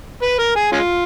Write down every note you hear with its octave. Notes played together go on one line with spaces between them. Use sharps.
B4
A#4
G#4
G#3 C#4 F4